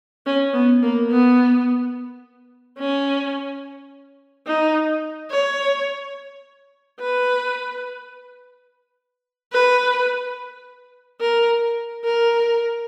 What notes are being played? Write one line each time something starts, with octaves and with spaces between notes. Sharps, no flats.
C#4
B3
A#3
B3
C#4
D#4
C#5
B4
B4
A#4
A#4